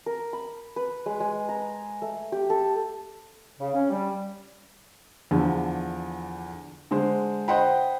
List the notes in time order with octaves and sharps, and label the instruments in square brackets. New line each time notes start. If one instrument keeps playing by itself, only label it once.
[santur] A#4
B5
B4
G#3
G#3
A#5
A3
G4
A4
[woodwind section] C#3
C#4
G3
[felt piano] E2 D3 F3
D3 G#3 C5
C5 D#5 F#5 G5 B5